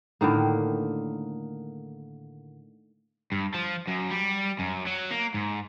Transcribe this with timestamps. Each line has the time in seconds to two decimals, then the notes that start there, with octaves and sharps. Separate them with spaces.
0.21 A2 D3 D#3 A#3
3.32 G2
3.54 F3
3.87 F#2
4.11 G3
4.59 F#2
4.87 F#3
5.11 A#3
5.34 G#2